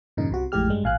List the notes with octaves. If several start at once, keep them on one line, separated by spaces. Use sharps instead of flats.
E2 G2 A#2 C#3 D#4
C2 C3 F#4
A1 F2 A2 G#3 G4 F6
G2 G3 G#3
A1 A#2 F5 G#5 F#6